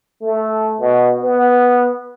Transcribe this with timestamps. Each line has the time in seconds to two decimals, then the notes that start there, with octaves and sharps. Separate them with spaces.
0.22 A3
0.80 B2
1.22 B3